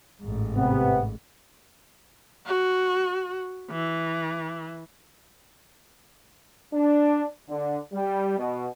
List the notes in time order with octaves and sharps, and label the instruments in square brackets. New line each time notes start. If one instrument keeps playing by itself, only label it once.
[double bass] A1 G#2
[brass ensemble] C3 B3
[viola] F#4
E3
[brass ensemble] D4
D3
G3
B2